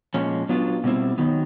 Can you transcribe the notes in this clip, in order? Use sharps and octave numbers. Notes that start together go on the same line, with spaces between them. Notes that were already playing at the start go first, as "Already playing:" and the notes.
A#2 F3 G#3 C#4
F#3 B3 D4 F4
B2 G3 C4 E4
D#3 F#3 B3